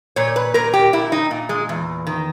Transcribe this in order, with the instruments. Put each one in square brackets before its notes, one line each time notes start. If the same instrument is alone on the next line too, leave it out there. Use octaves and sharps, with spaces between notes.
[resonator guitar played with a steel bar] A#2 C#5
B4
A#2 A#4
G4
A#2 E4
D#4
A#2
G#3
E2
D#3